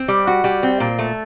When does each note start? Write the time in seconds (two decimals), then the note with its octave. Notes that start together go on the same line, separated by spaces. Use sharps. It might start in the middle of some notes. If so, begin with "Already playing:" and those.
Already playing: C4
0.08 G3
0.27 F#4
0.44 G3
0.63 C4
0.80 A#2
0.99 A3